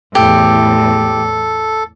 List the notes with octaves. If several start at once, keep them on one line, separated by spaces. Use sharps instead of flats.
E2 A2 G4 A4